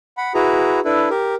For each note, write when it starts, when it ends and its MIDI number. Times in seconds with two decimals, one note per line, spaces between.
0.17 0.33 78
0.17 0.33 83
0.34 0.80 64
0.34 0.80 66
0.34 0.80 68
0.34 0.80 71
0.34 0.80 82
0.85 1.09 62
0.85 1.09 64
0.85 1.09 69
0.85 1.09 71
1.10 1.35 67
1.10 1.35 70